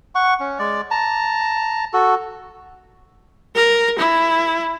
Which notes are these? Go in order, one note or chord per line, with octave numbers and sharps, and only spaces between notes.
F#5 C#6
C#4
G#3 D5
A5 A#5
F#4 A4
A#4
E4